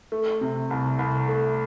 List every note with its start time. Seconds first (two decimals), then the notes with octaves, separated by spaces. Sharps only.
0.12 A3
0.41 C3
0.70 C2
0.99 C2
1.28 A3